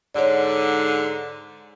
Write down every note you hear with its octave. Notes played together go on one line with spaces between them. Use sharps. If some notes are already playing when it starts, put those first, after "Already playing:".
G#2 D3 C#5 D5